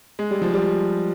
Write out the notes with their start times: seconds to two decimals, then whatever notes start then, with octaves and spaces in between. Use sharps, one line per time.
0.19 G#3
0.31 G3
0.42 F3
0.54 G3